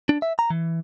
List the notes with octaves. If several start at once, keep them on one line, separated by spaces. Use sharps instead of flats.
D4
E5
A#5
E3